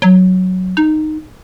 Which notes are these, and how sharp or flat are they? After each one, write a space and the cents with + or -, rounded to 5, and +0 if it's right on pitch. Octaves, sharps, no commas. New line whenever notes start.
F#3 +0
D#4 -10